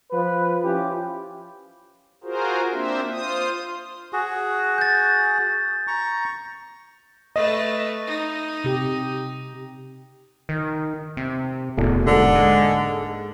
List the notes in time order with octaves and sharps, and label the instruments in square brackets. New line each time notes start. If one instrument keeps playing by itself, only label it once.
[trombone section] F3 B4
F3 C#4 E4 G4
[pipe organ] F4 F#4 G#4 A#4 C5
A#3 C4 D4 C5 E5
F4 C5 D#6
[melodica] F#4 G#4
[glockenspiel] G6 A6
[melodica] A#5 C#6
[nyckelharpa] A3 B4 [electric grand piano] D#5
[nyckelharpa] D#4
[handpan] C3 G4
[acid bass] D#3
C3
[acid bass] D1 [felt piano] E2 B2 A3
[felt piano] G#2 A#3 A4 [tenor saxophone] D3
[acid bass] G#3